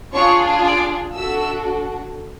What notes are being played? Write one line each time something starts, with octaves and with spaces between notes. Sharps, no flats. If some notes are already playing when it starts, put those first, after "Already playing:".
D4 F4 G#4 C#5 C#6
D5 D6
D4 F#4 A4 E5 E6